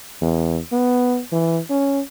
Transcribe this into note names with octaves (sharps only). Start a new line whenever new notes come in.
E2
B3
E3
C#4